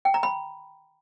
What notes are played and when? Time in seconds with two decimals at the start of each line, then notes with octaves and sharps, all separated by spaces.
0.05 G5
0.14 A#5
0.23 B5